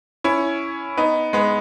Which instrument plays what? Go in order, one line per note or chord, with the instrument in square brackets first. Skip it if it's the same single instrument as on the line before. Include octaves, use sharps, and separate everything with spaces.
[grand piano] C#4 E4
B3 D#4
G#3 B3